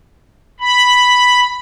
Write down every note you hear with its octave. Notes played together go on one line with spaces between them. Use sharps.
B5